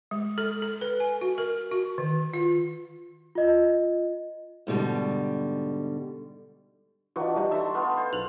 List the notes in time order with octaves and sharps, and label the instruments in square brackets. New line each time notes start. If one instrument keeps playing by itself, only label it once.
[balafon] G#3
A4
A4
B4
G#5
F#4
A#4
F#4
D#3
F4
[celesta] F4 D#5
[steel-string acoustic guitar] G#2 B2 D3 G3
[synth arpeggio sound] E3 D#4 F4 [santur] D4 F#4
[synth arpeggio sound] E3 G3 D#4
[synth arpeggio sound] D#4 E5 [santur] A4 A#5 C6
[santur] A3 B3 F4
C5
[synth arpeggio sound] B1 F6 F#6